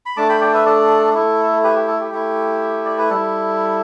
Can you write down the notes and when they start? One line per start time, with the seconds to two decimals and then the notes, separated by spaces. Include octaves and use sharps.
0.06 B5
0.17 A3 D4 A5 D6
0.29 G5 B5
0.41 D5 G5
0.53 B4 E5
0.66 A4 D5
1.15 A3 E4 A4
1.63 G4 B4
1.76 G4
1.88 A4
2.00 G4
2.12 A3 E4
2.85 D5
2.98 B4
3.10 G3 E4 A4